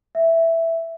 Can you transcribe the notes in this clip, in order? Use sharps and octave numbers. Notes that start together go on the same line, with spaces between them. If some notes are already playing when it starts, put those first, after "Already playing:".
E5